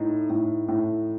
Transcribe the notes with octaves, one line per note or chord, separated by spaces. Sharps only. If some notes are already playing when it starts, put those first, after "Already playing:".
Already playing: A2 D#4
A2
A2